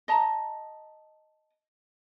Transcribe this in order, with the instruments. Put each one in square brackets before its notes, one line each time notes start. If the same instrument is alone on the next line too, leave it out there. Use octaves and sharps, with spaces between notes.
[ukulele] D#5 A5 A#5